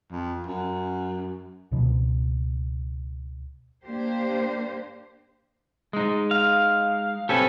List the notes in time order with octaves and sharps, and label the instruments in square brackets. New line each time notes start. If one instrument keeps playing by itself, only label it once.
[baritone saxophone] F2
F#2
[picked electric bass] C#2 B2 F3
[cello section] A#3 D4 G4 C5
[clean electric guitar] G#3 D#4
[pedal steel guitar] F5
[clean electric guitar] C4 C#4 A4 [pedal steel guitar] G4 B4 G#5